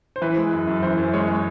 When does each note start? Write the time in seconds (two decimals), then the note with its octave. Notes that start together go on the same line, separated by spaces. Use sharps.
0.16 C5
0.22 E3 B4
0.37 G#3
0.52 F#2
0.67 F#2
0.82 E3 C5
0.97 F#2
1.14 G#3 C#5
1.29 G#3